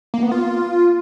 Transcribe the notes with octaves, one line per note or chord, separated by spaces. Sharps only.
A#3
B3
F4